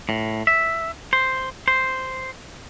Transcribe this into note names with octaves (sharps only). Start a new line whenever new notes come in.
A2
E5
C5
C5